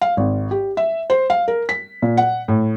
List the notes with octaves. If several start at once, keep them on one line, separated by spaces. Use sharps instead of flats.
F5
G#1
G4
E5
C5
F5
A#4
B6
A#2
F#5
A2